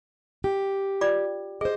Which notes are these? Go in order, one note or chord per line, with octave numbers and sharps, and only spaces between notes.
G4
F4 D5 D6
G#4 C5 D#5